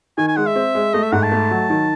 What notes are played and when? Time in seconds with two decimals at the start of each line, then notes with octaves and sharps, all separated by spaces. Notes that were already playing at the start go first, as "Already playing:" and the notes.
0.18 D#3 G#5
0.28 G#5
0.36 G#3 F#5
0.46 E5
0.56 C4
0.75 G#3
0.94 A3 D#5
1.03 E5
1.12 G#2 F#5
1.23 A5
1.32 A3
1.51 F#3
1.70 D#3